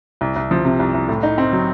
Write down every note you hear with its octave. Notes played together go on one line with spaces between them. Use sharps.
C2
C2
F3
C3
C2
C2
A2
D#4
C4
F#3